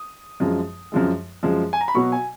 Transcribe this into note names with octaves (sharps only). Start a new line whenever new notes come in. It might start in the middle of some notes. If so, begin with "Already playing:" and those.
Already playing: D#6
F#2 F3 G#3
F#2 F3 G#3
F#2 F3 G#3
G#5
A#5
B5
B2 F#3 C#6
G#5